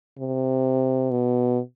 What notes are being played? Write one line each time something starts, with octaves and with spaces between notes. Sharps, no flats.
C3
B2